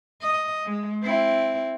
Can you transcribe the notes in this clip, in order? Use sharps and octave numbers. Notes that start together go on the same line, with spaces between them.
D#5
G#3
C4 E4